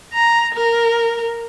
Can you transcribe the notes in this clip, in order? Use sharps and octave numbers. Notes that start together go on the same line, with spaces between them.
A#5
A#4